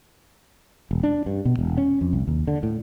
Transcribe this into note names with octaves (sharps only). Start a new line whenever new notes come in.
E1
D4
G2
B2
E1
C#4
F2
C2
D#2
D3
A2